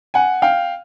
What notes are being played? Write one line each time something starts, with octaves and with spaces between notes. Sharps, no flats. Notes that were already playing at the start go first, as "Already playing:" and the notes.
F#5 G#5
F5 G5